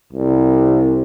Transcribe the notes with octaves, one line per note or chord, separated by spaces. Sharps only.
C2